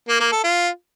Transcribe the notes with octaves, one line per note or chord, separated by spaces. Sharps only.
A#3
A#3
A4
F4